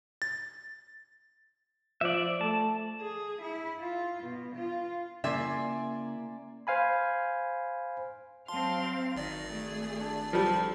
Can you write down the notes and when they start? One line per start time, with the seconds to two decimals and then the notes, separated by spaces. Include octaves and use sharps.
0.22 A6
2.01 F3 D5 E5
2.41 A3 A5
3.00 G#4
3.41 E4
3.80 F4
4.23 B2
4.55 F4
5.24 C#3 A#3 E4 D5 E5 G#5 C6
6.67 C5 F5 G#5 B5
8.48 F#3 C4 F5 A5 C6
9.16 G#1 D#3 D5
9.49 A3 G#4
10.00 D4
10.33 F3 G3 A4 A5